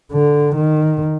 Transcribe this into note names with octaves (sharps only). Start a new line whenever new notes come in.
D3
D#3